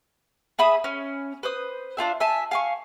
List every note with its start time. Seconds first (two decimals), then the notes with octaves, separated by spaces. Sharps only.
0.59 G#4 E5 B5 D#6
0.84 C#4 G#5
1.43 B4 C5 D#6
1.97 D4 F4 G#4 E5
2.20 E5 G#5 A5
2.51 F5 G#5 C#6